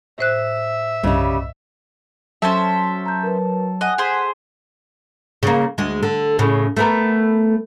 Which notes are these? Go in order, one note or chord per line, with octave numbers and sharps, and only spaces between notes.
A2 C5 E5 F#6
C2 G2 C#3 G3 D#5
F#3 C#4 A4 C5 E5 A5
A#5 G6
A#4 B4
D#5 F#5 G#5 F#6
G#4 C5 B6
C#3 A#3
D2 G#3
D3
A2 C#3
A3 B3 A#4